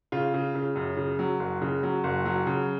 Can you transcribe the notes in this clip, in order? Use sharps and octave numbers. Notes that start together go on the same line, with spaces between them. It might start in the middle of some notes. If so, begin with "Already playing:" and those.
C#3 F4
C#3
C#3
F#2
C#3
F#3
F#1
C#3
F#3
F#1
F#3
C#3